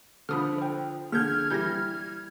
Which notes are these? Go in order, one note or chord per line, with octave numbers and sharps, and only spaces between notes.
D3 F3 B5 D#6 F6
C5 G5
D3 A#3 G#4 F6 G6 G#6
E3 G3 G6 A#6